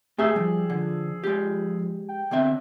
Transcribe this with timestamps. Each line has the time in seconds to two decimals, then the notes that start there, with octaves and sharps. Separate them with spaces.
0.18 A3 G4 G#4 E5 G#5 E6
0.36 F3 G3
0.70 D3
1.24 G#3 G4
2.09 G5
2.31 D3 C4 E5